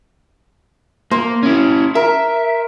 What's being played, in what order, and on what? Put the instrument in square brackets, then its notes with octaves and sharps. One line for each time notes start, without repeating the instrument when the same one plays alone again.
[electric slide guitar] A#3 [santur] C5
[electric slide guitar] C#4 E4
[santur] A#4 [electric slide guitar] E5